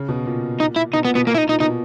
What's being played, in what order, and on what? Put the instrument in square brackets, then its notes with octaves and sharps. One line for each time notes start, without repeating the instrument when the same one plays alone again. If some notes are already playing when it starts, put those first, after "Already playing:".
Already playing: [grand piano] C#3
B2
A#2
[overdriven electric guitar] D#4
E4
[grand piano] B2 [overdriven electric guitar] D#4
[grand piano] A#2 [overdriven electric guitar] B3
[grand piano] B2 [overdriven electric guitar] B3
[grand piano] A#2 [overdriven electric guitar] A#3
[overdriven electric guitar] E4
D#4
[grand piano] A#2 [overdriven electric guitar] D#4
[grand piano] B2 [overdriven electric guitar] D#4